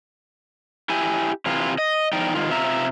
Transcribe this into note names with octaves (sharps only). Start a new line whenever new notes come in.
E4 G4 G#5
C3 E3 F4
D#5
E2 F3 D#4 D5 G5
G#2 D#3 F4
C3 F4 E5 A#5